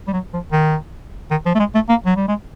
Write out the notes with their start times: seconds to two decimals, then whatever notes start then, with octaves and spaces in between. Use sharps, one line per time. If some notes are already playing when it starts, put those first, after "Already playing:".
0.08 G3
0.13 F#3
0.33 F3
0.52 D#3
1.31 D#3
1.45 F3
1.55 A3
1.59 G#3
1.75 A3
1.89 A#3
2.06 F#3
2.16 G3
2.28 G#3